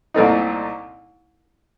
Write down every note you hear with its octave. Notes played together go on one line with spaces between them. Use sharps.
C2 A#2 A3 C4 D#4